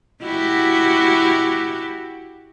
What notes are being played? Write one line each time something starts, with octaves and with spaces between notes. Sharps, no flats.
E4 F#4 G4